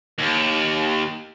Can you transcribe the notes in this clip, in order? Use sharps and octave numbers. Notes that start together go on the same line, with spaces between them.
D#2